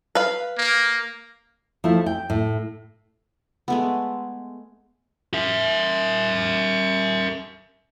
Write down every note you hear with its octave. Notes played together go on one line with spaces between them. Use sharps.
B4 F5
A#3
F3 A3 E4
G5
A2
G#3 A3 B3
A#4 E5